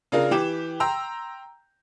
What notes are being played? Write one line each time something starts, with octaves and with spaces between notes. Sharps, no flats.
C#3 D4 F4 A#4
E3 G4 D6 E7
G5 A#5 C6 E6